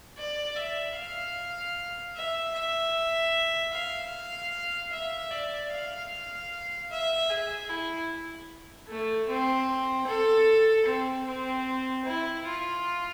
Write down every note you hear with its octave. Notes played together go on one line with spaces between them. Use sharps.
D5
E5
F5
E5
E5
F5
E5
D5
F5
E5
G#4
E4
A3
C4
A4
C4
C4
E4
F4